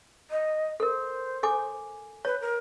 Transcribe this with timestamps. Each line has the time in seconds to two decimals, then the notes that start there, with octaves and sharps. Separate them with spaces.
0.30 D#5
0.80 A4 A#4 C5
1.43 A4 G#5 D6
2.25 B4 C#5
2.41 A#4